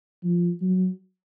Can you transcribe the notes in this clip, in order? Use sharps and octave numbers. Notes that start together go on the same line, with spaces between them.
F3
F#3